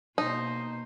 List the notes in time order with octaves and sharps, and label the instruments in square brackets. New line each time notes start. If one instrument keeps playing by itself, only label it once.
[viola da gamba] B2 A#3 C5 [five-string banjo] D#4